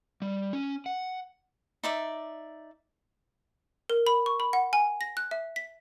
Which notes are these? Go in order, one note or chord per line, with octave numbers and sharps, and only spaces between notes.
G3
C#4
F#5
D#4 D5 E5
A#4
B5
C#6
B5
F#5
G#5
A#6
F#6
E5
B6